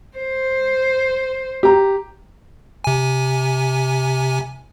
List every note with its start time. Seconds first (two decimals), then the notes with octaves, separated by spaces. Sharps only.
0.18 C5
1.63 G4 A#5
2.84 C3 G#5